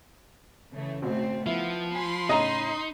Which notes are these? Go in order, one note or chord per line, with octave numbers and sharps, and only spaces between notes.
C#3 E3 A3
G#1 B2 A3 C4
F3 B3 E4
G#5 B5 C6
A2 C#3 D#4 D#5 A#5